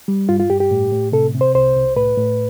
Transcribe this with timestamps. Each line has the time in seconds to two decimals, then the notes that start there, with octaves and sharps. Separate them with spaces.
0.08 G3
0.29 G2 F4
0.39 F4
0.50 G2 G4
0.60 G4
0.71 A2
0.92 A2
1.12 C3 A4
1.34 C3
1.41 C5
1.55 C2 C5
1.76 C2
1.97 A2 B4
2.17 A2